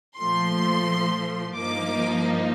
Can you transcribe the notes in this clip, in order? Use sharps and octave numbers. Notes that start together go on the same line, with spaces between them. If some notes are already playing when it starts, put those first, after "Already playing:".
A#2 F3 A3 C6
G2 F3 A#3 D#4 D6